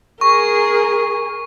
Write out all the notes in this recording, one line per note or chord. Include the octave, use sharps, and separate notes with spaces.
G#4 A#4 C#6